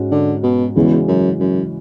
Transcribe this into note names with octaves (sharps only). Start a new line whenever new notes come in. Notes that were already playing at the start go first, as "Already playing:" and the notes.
Already playing: G#2 G#3 C#4 F#4
D3
B2
E2 C#3 E3 G#3 C#4 F#4
F#2
F#2